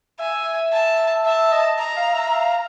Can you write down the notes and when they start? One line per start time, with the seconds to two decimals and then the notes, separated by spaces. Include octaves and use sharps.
0.20 E5 G#5
0.72 A5
1.26 E5 A5
1.52 D#5
1.79 A#5
1.97 F5
2.14 E5
2.32 F5